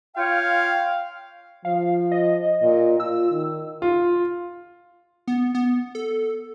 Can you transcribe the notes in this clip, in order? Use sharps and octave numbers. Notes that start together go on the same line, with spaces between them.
F4 C#5 F5 G5
F3 F5
D#5
A#2
F4 E6
D#3
F4
B3
B3
A4